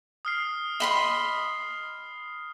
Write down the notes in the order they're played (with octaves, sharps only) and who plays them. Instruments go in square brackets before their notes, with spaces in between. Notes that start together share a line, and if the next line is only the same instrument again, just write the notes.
[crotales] D#6 F6 C7
[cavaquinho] D#5 B5 C6